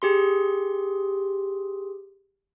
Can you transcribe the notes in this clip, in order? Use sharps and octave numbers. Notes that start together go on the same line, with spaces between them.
G4 G#4 C6